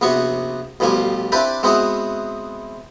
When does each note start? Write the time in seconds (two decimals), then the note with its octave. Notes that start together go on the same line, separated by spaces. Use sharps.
0.01 A#1 C3 B3 F#4 C#6
0.80 A1 B2 F3 G3 G#5
1.32 C4 D4 E4 G4 B4
1.63 G#3 B3 C4 E4 F#4